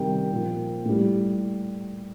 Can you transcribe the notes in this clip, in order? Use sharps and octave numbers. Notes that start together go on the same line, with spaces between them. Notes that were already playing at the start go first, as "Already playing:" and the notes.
Already playing: C3 D#3 G3 G5
A#2 F3
A2 G3